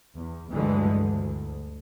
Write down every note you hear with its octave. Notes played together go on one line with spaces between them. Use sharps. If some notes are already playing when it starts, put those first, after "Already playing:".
E2
D2 G2 D3 E3 F#3 G#3
D2